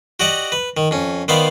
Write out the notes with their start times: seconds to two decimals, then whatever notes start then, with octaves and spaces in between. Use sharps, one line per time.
0.20 F#4 G4 D5 D#5 F#5
0.52 B4
0.77 D#3
0.91 F2 C#4
1.28 D#3 B3 C5 D5 F5 B5